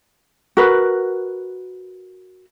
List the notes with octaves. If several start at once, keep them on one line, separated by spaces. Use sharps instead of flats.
F#4 A#4 B4